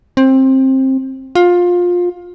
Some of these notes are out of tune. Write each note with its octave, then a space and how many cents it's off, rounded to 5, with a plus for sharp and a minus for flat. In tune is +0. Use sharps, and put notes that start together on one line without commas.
C4 +20
F4 +20